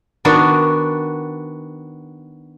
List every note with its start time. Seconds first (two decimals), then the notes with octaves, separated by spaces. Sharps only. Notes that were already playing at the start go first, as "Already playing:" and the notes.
0.25 D#3 B3 D4 F#4